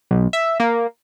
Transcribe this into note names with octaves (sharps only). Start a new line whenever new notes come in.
B1
E5
A#3